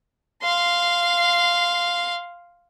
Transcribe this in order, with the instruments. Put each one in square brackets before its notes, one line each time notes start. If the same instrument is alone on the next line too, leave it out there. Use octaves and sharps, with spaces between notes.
[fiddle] F5 C6